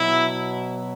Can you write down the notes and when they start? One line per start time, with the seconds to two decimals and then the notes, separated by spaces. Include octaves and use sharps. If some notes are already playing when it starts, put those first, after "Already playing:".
Already playing: B2 F#3 E4